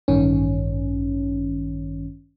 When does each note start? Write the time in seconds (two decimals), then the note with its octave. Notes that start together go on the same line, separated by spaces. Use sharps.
0.08 A1 G2 D#3 C#4